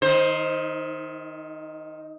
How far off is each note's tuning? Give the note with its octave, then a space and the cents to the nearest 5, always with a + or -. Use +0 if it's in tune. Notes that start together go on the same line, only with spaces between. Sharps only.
D#3 +0 D#4 +45 C5 +10